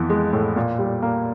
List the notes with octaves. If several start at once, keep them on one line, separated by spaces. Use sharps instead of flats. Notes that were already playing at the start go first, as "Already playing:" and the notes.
Already playing: F2 E3 B3
G#3
A2
A#2
G3
A#3